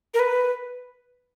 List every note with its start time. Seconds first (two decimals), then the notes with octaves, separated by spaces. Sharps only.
0.14 A#4
0.19 B4